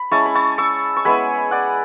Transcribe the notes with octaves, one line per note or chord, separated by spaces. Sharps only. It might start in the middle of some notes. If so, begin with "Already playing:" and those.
Already playing: B5
G#3 C#4 E4 A5 C#6
B5
A5 C#6
C#6 E6
C#6
G#3 B3 E4 G#5 B5
D5 F#5